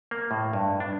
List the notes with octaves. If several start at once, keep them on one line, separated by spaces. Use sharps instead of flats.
A#3
A2
G2
D4